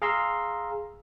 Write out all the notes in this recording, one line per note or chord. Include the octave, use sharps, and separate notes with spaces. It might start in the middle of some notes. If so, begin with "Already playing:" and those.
G#4 F5 A#5 C6 E6